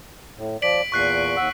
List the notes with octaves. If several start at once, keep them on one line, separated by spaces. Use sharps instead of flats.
A2
F3 D5 B6 D7 F#7
E2 A#2 C#6 F#6 C7
D#2 F#5 E6